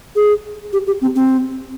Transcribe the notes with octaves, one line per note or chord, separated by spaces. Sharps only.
G#4
G4
G4
C4
C4